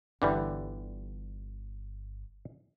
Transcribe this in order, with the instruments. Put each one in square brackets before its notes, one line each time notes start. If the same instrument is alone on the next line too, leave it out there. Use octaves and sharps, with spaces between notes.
[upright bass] G1 [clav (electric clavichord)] D3 E3 G3